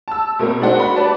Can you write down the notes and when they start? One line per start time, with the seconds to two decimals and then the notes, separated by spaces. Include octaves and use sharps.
0.08 A5 E6
0.39 B2 A3 A#3 C4 A#4
0.60 G#3 A3 D4 D#4 F#4 C5
0.80 F#4 B5
0.96 G4 B4 D5 A5